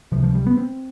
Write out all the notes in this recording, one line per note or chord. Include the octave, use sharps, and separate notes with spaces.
C#2 C3 F3
F3
G3
B3
C4